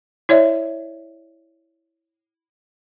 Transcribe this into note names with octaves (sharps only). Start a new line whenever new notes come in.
E4 C#5 D5 E5